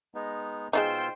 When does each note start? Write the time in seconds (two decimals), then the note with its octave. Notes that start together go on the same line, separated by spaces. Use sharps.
0.15 G#3 B3 D#4
0.73 B2 G#3 D4 D#4 F4 C5 G5 E6